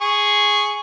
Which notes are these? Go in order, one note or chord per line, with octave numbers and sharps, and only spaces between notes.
G#4 C#6